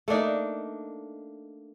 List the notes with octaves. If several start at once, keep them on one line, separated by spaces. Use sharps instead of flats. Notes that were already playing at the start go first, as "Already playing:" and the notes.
A3 A#3 D4 D#4